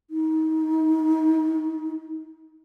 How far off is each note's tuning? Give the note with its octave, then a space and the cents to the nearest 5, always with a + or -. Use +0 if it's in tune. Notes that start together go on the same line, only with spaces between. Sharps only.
D#4 +25